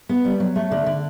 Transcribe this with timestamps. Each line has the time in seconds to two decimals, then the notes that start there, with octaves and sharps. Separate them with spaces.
0.09 B3
0.25 G3
0.40 F#3
0.56 A3
0.71 D3
0.86 D3